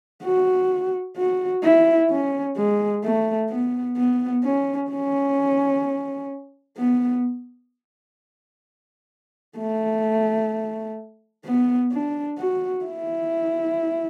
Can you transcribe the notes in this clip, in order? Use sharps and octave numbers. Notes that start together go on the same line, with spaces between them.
F#4
F#4
E4
C#4
G#3
A3
B3
B3
C#4
C#4
B3
A3
B3
D4
F#4
E4